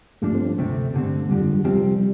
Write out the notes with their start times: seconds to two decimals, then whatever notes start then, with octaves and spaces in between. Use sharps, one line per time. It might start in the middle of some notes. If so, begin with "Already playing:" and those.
0.22 G2 F3 A3 D4
0.35 C4
0.58 D2 C3 A3 C4
0.94 G2 D3 A3 C4
1.29 F2 D3 F3 G3
1.53 G3
1.64 C2 C3 F3 G3 C4 G4